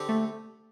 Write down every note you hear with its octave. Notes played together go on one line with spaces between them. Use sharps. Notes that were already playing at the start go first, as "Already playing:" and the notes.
Already playing: D3 C4 G4
A3